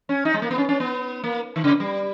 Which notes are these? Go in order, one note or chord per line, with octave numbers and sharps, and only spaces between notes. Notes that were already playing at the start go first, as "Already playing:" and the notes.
C#4
D#4
G#3
A#3
B3
C#4
C#4
B3
A#3
D#3
C#3
G3